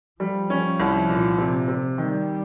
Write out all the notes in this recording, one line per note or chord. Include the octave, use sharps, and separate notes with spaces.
F3 G3
C#4
C2
A#2
C3
C3
D#3 G3